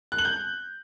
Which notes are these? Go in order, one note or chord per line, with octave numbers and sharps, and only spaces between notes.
F#6
F#7
G6